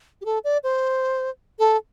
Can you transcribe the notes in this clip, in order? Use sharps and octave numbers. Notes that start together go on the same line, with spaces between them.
G4
A4
D5
C5
A4